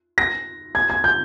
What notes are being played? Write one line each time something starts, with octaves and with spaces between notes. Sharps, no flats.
A#6
G#6
G#6
G6